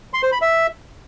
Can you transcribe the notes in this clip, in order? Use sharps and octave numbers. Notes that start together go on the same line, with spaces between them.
C6
C5
B5
E5